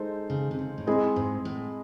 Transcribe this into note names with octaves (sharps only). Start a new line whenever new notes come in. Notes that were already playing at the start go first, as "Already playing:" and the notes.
Already playing: G#3 D#4 A4 C5
C#3
C3
C#3
A2
G#2 G#3 C4 E4 G#4 D#5
G#2
A2